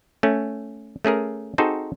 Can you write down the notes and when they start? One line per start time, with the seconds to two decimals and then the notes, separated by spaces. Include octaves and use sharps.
0.23 A3 C#4
1.05 A3 C#4 G#4 A#4
1.58 C4 D#4 F#4 G#4 A4 C5